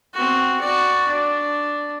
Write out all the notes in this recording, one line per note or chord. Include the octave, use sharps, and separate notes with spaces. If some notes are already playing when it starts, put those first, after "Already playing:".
C4 F#4
F#4 D5
D4